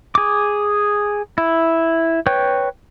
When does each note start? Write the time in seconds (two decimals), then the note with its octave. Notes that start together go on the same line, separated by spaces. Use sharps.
0.15 G#4 D6
1.38 E4
2.26 B4 C#5 G5